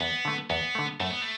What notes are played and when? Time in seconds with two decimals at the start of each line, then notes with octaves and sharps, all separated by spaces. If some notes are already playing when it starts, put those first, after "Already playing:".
0.01 E2 B3
0.25 D3 A3
0.50 E2 B3
0.75 D3 A3
1.00 F#2 A3
1.10 B3
1.21 A3